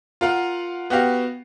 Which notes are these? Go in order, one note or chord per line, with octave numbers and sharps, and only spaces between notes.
F4 A#4 F5 F#5
B3 F#4 G4 F5